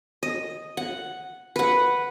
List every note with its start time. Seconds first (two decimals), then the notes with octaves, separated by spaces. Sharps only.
0.23 D#5
0.77 F#5
1.56 B4 F#5